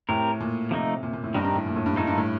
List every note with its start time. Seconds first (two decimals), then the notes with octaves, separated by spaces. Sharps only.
0.09 A2 C4 G4 A#4
0.40 A#2
0.71 C3 F3 A3 D#4
1.03 A#2
1.13 A#2
1.24 A2
1.34 G2 G3 C4 D#4 G4 A#4
1.45 G2
1.55 A2
1.66 A#2
1.76 A2
1.86 G2
1.96 A2 A#3 D#4 A4 C5
2.07 G2
2.18 A2